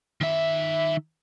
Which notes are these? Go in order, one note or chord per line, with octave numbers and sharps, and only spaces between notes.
D#3 E5